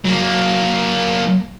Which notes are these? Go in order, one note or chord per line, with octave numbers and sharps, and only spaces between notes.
F#3 A#3